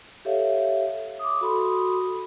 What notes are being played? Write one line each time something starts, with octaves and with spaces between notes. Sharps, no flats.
G4 A4 C#5 E5 F5
D6 D#6
F#4 A4 B5 C6 D#6